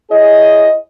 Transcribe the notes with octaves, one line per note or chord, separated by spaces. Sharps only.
E4 G#4 C#5 D#5